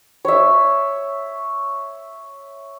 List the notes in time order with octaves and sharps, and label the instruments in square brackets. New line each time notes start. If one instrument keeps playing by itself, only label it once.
[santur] C#5 E5